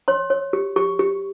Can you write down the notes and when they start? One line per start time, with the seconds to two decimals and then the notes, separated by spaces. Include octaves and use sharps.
0.08 C#5 C6
0.30 C#5
0.53 G4
0.76 G4 C#6
0.99 G4